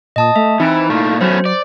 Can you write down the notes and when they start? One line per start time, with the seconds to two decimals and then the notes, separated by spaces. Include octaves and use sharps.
0.16 A#2 D#5 A5 D#6
0.36 A3 E5
0.60 E3 C4 D#4 E4 D7
0.89 A#2 A3 F5
1.21 F#3 A3 B3 C#4 C5
1.46 D5